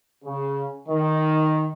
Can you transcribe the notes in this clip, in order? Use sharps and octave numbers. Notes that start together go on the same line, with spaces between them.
C#3
D#3